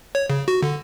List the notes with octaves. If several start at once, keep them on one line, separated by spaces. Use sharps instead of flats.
C#5
C#3
F#4
D3